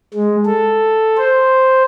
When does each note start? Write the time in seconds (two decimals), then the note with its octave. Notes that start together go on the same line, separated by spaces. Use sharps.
0.14 G#3
0.46 A4
1.18 C5